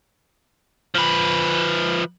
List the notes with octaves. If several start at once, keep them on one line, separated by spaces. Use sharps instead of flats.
F3 B4